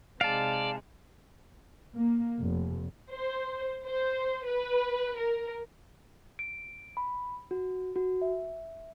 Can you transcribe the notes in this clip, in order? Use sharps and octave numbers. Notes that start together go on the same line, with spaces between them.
C3 G#3 D#4 D5 F5 A5
A#3
F1
C5
C5
B4
A#4
D7
B5
F#4
F#4
E5